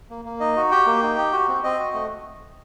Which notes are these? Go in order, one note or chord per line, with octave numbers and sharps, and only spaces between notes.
A#3
A#3
D#4 D#5
F#4
G4 G5
A#3
D#4
G4
F#4
C4
C4 D#5
F#4
A3